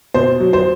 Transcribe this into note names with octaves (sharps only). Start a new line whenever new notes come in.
B2 C5
F#3
C5